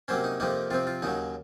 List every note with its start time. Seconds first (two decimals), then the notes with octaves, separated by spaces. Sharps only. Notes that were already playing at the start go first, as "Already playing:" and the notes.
0.08 C3 F#3 A#3 C#4 C5
0.24 D#4
0.40 F2 C3 F3 A#3 D#4
0.71 C3 F3 C4 F4
0.87 F4
1.02 D#2 C#3 F#3 D#4